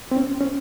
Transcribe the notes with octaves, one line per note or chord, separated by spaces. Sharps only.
C4
C#4
C#4